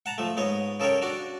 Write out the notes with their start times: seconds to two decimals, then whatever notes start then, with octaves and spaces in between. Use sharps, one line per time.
0.06 F#5 A5 A#5
0.18 F3 A3
0.37 G#2 B3 C#5 D#5
0.80 C#3 A4 A#4 C#5 G5
1.02 D4 F#4 D5